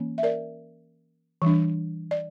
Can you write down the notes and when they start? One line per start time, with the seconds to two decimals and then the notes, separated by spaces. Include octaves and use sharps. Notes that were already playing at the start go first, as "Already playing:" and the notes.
Already playing: E3 A#3 C#4
0.18 E5
0.23 A#4 D5
1.42 E3 G3 D4
2.11 D5